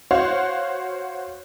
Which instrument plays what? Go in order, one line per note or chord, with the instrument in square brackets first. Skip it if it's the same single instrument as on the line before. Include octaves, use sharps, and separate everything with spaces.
[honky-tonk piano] F#4 C5 C#5 F5 F#5